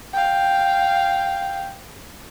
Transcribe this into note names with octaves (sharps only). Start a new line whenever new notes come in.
F5 G5